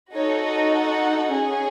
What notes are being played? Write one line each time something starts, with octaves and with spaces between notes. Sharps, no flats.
D#4 F#4 A4 C#5
D#5
F#5
C#4 G#4